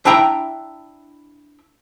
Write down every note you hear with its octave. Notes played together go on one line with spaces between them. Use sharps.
D4 E4 E5 G5 A#5